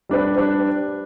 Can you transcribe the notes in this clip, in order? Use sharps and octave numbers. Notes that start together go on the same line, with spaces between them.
G3 D4 B4
G3 D4 B4